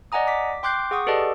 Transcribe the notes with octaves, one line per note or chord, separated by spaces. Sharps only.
D5 D#5 F#5 G#5 A#5 D#6
D6 B6
G5 C6 D6 F#6 G6 C7
G#4 F#5 C#6 D#6
G4 A4 B4 D5 D#5 A5